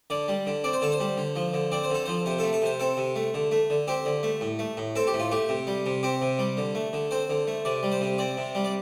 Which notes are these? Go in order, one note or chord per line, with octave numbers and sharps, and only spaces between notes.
D3 D5
G3
D3
C4 D5
C5
D3 A4
C5
G3
D3
F3
D3
C4 D5
C5
D3 A4
F3 C5
C3 C5
A3 A4
A4
C3 C5
C4 A4
C3
A3
D3
A3
D3
C4 G4
D3
A3
A2
A3
A2
C4 A4
G4
A2
F4
A3 G4
C3
G3
C3
C4 G4
C3
G3
D3
A3
D3
C4 C5
D3
A3
C3 D5
G3
C5
C3
C4 D5
C3
G3
D5